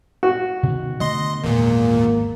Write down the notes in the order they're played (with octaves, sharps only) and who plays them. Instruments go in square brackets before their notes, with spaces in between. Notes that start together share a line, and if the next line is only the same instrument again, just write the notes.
[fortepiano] F#4
[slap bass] B2 D#3
[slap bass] D3 A3 B3 [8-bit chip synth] D#5 C6
[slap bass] G#1 [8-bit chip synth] E2 A#2 [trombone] A#3